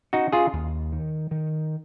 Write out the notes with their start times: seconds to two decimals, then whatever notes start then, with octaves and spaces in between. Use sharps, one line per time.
0.13 C#4 D#4 F#4
0.32 F4 G#4
0.53 D#2
0.92 D#3
1.31 D#3